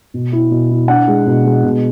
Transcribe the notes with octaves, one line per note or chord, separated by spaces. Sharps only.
B2
E4
B2
E4
D4 F#5
G#3
B2
G#3
B2